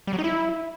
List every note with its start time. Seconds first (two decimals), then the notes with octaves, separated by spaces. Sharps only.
0.07 G3
0.13 F#3
0.18 D#4
0.24 E4